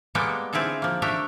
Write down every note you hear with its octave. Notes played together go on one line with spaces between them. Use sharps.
G3 G#3 A#3 B3 A4 G5
D3 C4 E4 F4 G#4 A4
F3 A#3
A3 D4 G4 A#4 E5 A#5